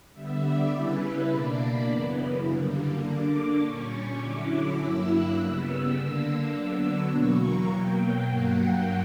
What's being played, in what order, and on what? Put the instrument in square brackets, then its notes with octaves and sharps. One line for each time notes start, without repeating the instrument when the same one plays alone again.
[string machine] D3 G3 B3 E5
D5
C#3 G3 C#4 E4 B4
B4
B2 A#3 D4 D5
B5
F#2 C#3 E3 B3
F#2 D3 G3 A#3
D3 A#3 D4 D6
A#2 G3 C#4 C#6
C#6
D3 F#3 C#4 E4 D6
G2 F#3 A#3 E4 E6
F#6
C#3 G3 B3 E6
D3 A#3 D4
D3 F#3 B3 D4
E2 B2 F#3 A#3 C#6
A#5
B2 F#3 A#3 G5
G2 F#3 A#3 F#5
G5